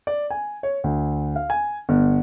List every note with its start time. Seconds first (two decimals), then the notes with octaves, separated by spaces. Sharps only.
0.07 D5
0.30 G#5
0.63 C#5
0.84 D2
1.36 F5
1.50 G#5
1.89 G1